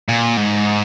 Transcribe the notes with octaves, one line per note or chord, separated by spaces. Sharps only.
A#2
G#2